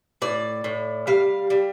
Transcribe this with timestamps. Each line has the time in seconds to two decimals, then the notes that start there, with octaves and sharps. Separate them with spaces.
0.22 A2 D5
0.64 A2
1.07 G3 F5
1.50 G3